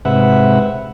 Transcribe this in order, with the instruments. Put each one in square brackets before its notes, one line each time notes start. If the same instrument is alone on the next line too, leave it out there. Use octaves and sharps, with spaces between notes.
[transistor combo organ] G#2 C3 B4 E5 F#5